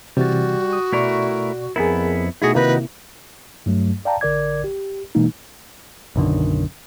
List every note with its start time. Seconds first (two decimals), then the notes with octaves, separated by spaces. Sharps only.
0.17 C3 E3 G3 F#4 A6
0.73 D#6
0.93 B2 A3 E4 A#4 D5 C#6
1.76 F2 B3 E4 G#4 A#4
2.42 B2 A3 D#4 E4 F#4 G#4
2.55 C3 D#3 A#3 D#4 E4 F#4 B4
3.66 G2 F#3 A3
4.05 D5 F5 G5 A5 A#5
4.21 A1 D3 A#4 D5 D6 G#6
4.64 G4
5.15 B2 E3 G#3 A#3 D#4
6.16 B1 F#2 D3 D#3